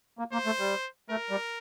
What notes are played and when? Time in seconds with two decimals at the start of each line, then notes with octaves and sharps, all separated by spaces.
0.19 A#3
0.33 A#3 C5
0.46 A3
0.59 G3
1.10 A3 A#4
1.30 G3